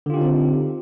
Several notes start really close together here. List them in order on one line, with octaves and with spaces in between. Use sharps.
D3 F4 G4 D#4 C4